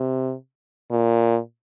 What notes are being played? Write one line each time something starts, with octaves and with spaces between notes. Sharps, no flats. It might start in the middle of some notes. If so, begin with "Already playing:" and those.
Already playing: C3
A#2